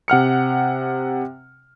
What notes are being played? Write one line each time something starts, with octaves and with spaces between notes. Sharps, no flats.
C3 F#5 F6 C#7